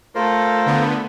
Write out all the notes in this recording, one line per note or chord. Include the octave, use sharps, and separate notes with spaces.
A3 F4 A4 A#4 C5
D3 B3